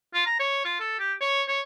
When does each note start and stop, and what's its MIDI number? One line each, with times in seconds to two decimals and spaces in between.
0.14 0.22 65
0.26 0.38 82
0.39 0.60 73
0.65 0.76 65
0.80 0.97 69
0.99 1.13 67
1.21 1.42 73
1.48 1.61 73